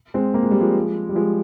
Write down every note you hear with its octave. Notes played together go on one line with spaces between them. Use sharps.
G#3 C4
A#3
G#3
G3
F3 G#3
G3
F3 G#3